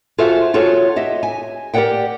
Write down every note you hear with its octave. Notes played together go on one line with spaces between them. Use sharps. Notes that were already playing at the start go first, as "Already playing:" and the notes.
F4 F#4 G#4 A4 C5 E5
F4 F#4 G#4 A4 C#5
G4 D#5 E5
G#5
G4 A#4 C#5 D5 F#5 G5